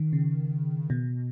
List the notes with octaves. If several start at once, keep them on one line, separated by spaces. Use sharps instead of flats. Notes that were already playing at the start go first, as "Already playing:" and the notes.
Already playing: D#3
C#3
B2